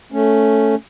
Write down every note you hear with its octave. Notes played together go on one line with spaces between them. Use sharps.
A3 C#4